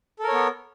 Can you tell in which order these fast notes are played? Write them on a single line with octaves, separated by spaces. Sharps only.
A4 A#4 C#5 B3